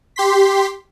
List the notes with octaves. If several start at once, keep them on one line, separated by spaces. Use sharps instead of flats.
G4 C6 B6